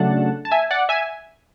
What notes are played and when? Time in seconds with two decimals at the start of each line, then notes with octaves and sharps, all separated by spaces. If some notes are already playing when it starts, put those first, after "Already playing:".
Already playing: C#3 F#3 A3 D4 F#5 A5
0.45 A5
0.51 E5 G#5
0.71 D5 F#5
0.89 E5 G#5